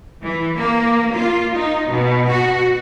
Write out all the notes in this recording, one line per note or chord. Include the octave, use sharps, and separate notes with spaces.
E3
A#3
F4
D#4
B2
F#4